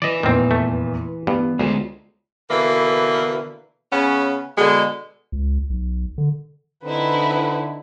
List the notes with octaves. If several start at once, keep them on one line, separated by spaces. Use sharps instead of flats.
E3 B4 D5 D#5
F1 E2 A#2 D#3 C4
A3
G2 B3
D2 G#3 F4 G#4
B2 D3 E3 A#3
C#3 B3 C#4
B2 D3 G#3
C#2
B1
D3
D3 C4 D#4 E4 B4